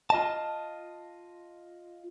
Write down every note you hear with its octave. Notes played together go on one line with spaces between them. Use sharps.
F4 D#5 A5